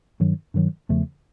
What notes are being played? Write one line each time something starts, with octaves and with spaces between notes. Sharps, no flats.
G2 D#3 F#3
G2 D#3 F#3
E2 C#3 F3 A3